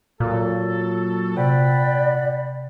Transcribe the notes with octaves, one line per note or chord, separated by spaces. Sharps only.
A#2 F#3 F#4 A4
C3 D5 F#5 G5 B5